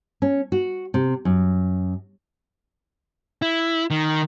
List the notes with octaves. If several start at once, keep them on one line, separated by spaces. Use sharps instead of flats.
C#4
F#4
C3
F#2
E4
D#3